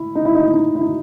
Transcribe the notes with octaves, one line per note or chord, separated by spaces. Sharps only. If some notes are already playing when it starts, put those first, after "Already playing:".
Already playing: E4
D#4
E4
D#4
E4
D#4
E4
D#4